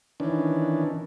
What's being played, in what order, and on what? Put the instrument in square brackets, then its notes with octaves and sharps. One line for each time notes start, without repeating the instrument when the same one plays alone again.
[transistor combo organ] D#3 E3 C#4 D4